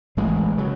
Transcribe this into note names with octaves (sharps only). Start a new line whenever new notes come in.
A1 A2 E3 G#3
C#3 F#3